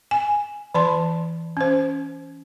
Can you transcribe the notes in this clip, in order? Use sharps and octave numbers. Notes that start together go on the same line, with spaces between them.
G#5
E3 D5 A5 C6
C#4 C5